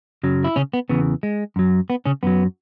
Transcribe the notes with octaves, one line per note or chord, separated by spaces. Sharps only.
F#2 C#3 F#3
E4
C#3 C#4
B3
E2 C#3 E3 B3
G#3
F#2 F#3
B3
C#3 C#4
F#2 F#3 B3